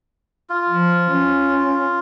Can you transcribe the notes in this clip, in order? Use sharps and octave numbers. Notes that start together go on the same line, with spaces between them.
F4
F3
C#4